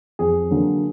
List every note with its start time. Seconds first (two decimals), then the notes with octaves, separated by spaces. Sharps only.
0.19 F2 G#4
0.50 D3 F#3 A#3